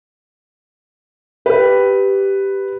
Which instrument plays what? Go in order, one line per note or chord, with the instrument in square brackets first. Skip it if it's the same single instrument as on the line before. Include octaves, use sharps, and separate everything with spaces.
[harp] G4 [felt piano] B4